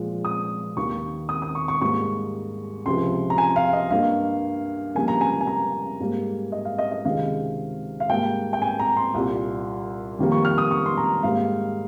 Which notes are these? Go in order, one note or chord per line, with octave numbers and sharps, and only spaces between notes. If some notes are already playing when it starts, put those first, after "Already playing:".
Already playing: A#2 F3 G#3
D#6
D#2 D#3 A#3 C#6
D#6
D#6
C#6
C#6
G#2 G3 A#3 C#6
C#2 C3 F3 C6
A#5
G#5
F5
D#5
G2 G3 A#3 F5
F2 C#3 G3 A#3 G#5
A#5
G#5
G#5
A#5
G#2 G3 A#3
D#5
F5
D#5
D#5
C#2 C3 D#3 G#3 F5
F5
G#2 G3 A#3 G5
G5
G#5
A#5
C6
C2 A#2 G3
F2 D#3 G3 A#3
C#6
F6
D#6
C#6
C6
A#5
G#2 G3 A#3 F5